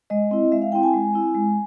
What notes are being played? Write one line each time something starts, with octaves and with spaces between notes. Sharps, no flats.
G#3 D#5
C4 E4
G#3 E5
F5
C4 E4 G5
G#5
G#3
C4 E4
G#3